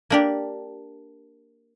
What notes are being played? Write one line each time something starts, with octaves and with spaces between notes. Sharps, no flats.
A#3 D4 G4